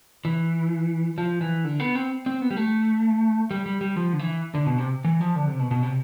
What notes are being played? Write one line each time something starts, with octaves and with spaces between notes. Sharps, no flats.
E3
F3
E3
D3
B3
C4
C4
B3
G3
A3
G3
G3
G3
F3
D3
E3
D3
B2
C3
E3
F3
D3
C3
B2
B2
C3